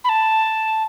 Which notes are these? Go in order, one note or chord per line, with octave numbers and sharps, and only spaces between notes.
B5
A5